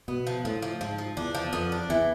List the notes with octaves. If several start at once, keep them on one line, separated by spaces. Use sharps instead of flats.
B2 B3
F3
A2 F3
F3
G#2 F3
F3
E2 D4
F3
F2 B3
D4
E2 E3